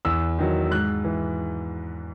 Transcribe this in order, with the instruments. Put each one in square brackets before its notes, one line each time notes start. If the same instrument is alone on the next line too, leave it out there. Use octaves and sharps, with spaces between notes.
[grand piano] E2 E6
D#3 F#3
G#2 F#6
E3